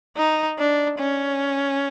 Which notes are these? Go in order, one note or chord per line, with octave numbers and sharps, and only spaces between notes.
D#4
D4
C#4